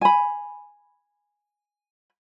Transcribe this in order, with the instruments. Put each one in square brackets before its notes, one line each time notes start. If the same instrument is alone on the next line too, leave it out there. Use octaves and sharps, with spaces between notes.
[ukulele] G#5 B5